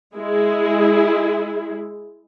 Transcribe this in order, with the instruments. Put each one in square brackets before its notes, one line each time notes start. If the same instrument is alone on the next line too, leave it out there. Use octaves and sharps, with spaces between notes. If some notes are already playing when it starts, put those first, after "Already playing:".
[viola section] G#3 E4 G#4